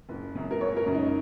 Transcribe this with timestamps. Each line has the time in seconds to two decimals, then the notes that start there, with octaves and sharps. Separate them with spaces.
0.09 F#1
0.35 F#2 C#3
0.51 A#4
0.61 F#1 C#5
0.77 A#4
0.86 F#2 C#3
0.94 D#4